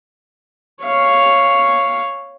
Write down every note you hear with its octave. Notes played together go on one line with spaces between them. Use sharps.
C#5 F5